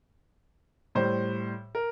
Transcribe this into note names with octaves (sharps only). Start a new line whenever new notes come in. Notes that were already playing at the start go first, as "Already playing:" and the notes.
A2 G3 C5
A#4